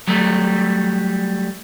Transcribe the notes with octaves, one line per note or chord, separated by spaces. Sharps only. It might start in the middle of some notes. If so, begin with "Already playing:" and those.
F#3 G3 A3